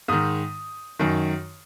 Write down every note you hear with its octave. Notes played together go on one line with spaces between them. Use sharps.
G#2 D#3 D#6
F#2 D#3